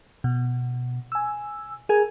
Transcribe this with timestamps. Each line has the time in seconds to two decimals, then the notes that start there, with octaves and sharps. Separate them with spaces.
0.24 B2
1.12 G#5 E6
1.89 G#4 A#4 G#5 G#6